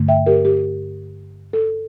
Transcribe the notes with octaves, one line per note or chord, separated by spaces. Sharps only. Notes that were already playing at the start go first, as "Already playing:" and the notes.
Already playing: G2 D3 A3 C#4
E5 G5
G4 A#4
G4
A4